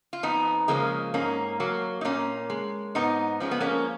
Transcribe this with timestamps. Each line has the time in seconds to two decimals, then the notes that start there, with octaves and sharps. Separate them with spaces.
0.13 F4
0.23 F2 B3 D#4
0.68 C#3 F3 G#3 A#3 C#4
1.14 G#2 A#3 C#4
1.60 F#3 A#3
2.01 D#4
2.05 A#2 A#3 C#4
2.50 G#3
2.95 G#2 B3 D#4
3.40 F3 G#3 C#4
3.51 B3
3.60 A#3 C#4